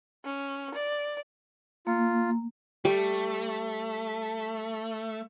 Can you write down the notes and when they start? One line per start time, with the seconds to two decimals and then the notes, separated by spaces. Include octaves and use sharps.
0.25 C#4
0.75 D5
1.87 A#3 F4
2.85 G3 A3